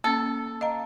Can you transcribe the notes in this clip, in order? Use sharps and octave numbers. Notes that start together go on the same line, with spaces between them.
A#3 C#4 A4
D#5 F5 A#5